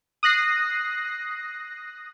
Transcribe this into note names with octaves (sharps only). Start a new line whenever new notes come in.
D#6 F#6 A#6 C7